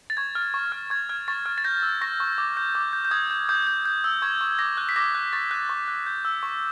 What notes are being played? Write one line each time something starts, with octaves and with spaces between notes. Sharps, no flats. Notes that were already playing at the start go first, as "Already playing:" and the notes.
A6
C#6 G#6
F6
C#6
F6
C#6 G#6
F6 G#6
C#6 A6
F6
A6
G6 A#6
E6
C#6 A#6
C#6
D6
G6
D6
G6
G6
D#6 G#6
G6
D#6 G6
G6
G6
E6
C#6 G#6
C#6
D6 A#6
F#6
B6
D6 A#6
F#6
C#6 A6
F#6
C#6
F#6
G6
E6
C#6